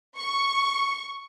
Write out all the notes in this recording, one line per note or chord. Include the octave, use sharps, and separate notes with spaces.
C#6